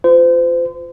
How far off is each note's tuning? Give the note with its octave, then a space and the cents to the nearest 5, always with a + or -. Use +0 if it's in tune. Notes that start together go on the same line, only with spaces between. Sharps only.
F4 +0 C5 -35